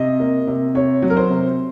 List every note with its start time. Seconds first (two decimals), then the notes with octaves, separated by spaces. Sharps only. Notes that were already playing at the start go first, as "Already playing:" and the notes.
Already playing: C3 D#5
0.20 A#3
0.47 C3
0.75 C3 C#5
1.02 F#3
1.10 A#4
1.17 C5
1.30 C3